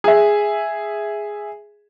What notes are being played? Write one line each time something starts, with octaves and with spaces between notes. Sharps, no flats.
G#4 E5